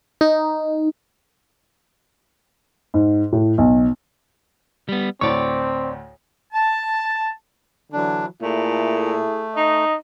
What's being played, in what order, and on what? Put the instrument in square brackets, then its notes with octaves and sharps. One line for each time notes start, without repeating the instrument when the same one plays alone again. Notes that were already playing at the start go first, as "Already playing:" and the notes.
[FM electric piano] D#4
[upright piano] G#2
A2
B1
[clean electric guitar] G3 B3
[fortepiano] D2 A2 [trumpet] C4 [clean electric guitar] C#5 D5 [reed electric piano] C#6
[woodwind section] A5
[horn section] D3 E3 F#3 [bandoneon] D4
[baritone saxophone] A#2 [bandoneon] A3 [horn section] E4 G#4 A4
[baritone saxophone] D#4 [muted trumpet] D#5